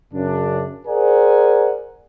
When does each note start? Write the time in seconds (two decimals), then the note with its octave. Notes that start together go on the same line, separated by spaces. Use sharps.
0.14 F#2 C#3 D4
0.87 G#4 A#4 C5 D5 F#5 G#5